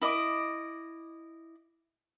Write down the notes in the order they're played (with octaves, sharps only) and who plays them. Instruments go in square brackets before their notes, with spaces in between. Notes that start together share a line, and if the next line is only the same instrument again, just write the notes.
[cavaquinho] E4 D#5 E5 D6